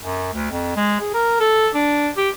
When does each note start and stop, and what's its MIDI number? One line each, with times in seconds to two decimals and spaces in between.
0.01 0.30 42
0.33 0.46 38
0.51 0.72 41
0.76 0.97 56
1.00 1.13 68
1.14 1.36 70
1.40 1.69 69
1.74 2.10 62
2.17 2.29 67